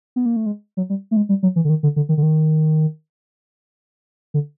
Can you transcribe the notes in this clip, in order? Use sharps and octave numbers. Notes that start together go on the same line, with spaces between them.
B3
A#3
A3
G#3
F#3
G3
A3
G#3
G3
F#3
E3
D3
D#3
D3
D3
D#3
D3
D#3
D3